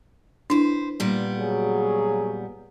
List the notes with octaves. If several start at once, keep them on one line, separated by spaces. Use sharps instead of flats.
D4 E4 B4 C5
A#2 G3 B3
C#3 F#3 G#4